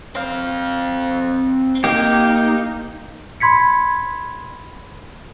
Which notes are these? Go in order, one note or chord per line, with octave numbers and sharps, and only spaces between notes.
C4 F5
A#3 D#4 G4
B5 C6 G#6 B6 C#7